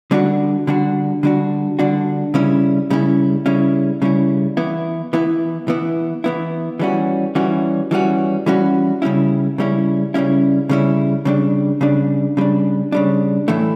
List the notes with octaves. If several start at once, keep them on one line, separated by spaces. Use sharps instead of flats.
D3 G3 D4 F#4
D3 G3 D4 F#4
D3 G3 D4 F#4
D3 G3 D4 F#4
C#3 G3 C#4 E4
C#3 G3 C#4 E4
C#3 G3 C#4 E4
C#3 G3 C#4 E4
E3 B3 E4
E3 B3 E4
E3 B3 E4
E3 B3 E4
E3 G3 C#4 F#4
E3 G3 C#4 F#4
E3 G3 C#4 F#4
E3 G3 C#4 F#4
C#3 G3 C#4 E4
C#3 G3 C#4 E4
C#3 G3 C#4 E4
C#3 G3 C#4 E4
C#3 G3 D4
C#3 G3 D4
C#3 G3 D4
C#3 G3 D4
A2 E3 A3 E4